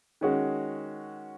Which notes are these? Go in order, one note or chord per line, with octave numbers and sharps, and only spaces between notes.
D#3 G#3 C#4 F#4